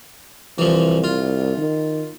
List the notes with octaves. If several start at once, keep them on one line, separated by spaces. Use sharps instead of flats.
C2 E3 F3
F4
D#3